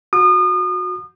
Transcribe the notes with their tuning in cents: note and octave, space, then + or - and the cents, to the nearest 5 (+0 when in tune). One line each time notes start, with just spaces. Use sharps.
F#4 -25 D#6 -35